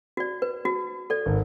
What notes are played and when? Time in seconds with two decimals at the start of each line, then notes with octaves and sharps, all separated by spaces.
0.17 F#4 D5
0.42 B4
0.65 F#4
1.10 A4 D5
1.26 G#1